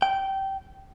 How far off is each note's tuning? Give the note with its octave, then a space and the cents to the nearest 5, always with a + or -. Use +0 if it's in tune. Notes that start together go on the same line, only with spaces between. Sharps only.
G5 -15